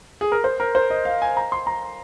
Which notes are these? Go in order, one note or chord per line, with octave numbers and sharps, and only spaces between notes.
G#4
A#4
C5
A#4
C5
D#5
F5
G#5
A#5
C6
A#5